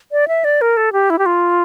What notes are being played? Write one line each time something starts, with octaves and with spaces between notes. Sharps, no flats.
D5
E5
D5
A#4
A4
G4
E4
G4
F4